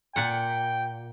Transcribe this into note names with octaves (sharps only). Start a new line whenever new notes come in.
A#2 F#5 G5